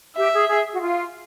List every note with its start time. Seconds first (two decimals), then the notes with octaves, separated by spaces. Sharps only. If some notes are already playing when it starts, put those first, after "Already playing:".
0.17 G4 E5
0.33 G#4
0.48 G#4
0.73 F#4
0.80 F4